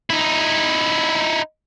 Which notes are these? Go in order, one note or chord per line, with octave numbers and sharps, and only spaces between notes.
D#4 E4